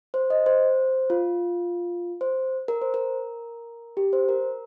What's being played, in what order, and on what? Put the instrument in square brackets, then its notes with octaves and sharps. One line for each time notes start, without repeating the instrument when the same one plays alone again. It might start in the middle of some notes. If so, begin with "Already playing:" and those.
[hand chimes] C5
D#5
C5
F4
C5
A#4
C5
A#4
G4
C5
A#4